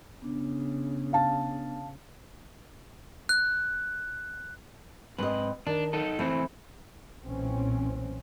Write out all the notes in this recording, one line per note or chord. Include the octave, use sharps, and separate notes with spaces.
C#3 B3 D4
F5 A5
F#6
G#2 C4 B4 D#5
D#3 D4
D#4 A4
E3 A3 C4 E4
B1 A#2 E3 C4 C#4